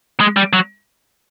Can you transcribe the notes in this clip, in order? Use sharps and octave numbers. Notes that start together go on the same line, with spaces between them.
G#3
G3
F#3